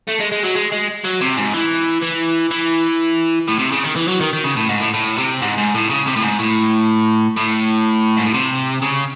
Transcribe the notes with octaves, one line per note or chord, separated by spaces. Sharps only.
A3
G#3
G#3
F#3
G#3
G#3
F#3
C3
G#2
E3
E3
E3
A2
C3
C#3
D#3
E3
F#3
D#3
D#3
C#3
A2
G#2
A2
A2
C3
G#2
G#2
A2
C#3
C3
A2
G#2
A2
A2
G#2
A2
C3
C#3